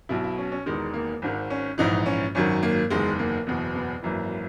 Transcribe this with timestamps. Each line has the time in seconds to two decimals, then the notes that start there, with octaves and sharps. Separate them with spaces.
0.09 B1 B2 E4
0.24 E4
0.38 C#4
0.52 C#4
0.66 E1 E2 D#3 G#3
0.94 A#3
1.22 G#1 G#2 D#3
1.50 C#4
1.78 A#1 G#2 E3 D#4
2.06 C#4
2.35 G#1 F#2 D#3 C#4
2.63 A#3
2.90 F#1 E2 D#3 G#3
3.19 A#3
3.46 F#1 E2 B2 B3
3.75 B3
4.03 G#1 F#2 E3 A#3